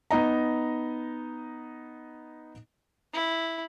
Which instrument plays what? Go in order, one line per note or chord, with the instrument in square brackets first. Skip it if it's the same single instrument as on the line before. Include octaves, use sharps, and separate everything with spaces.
[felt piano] B3 D#4 D#5 A#5
[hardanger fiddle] E4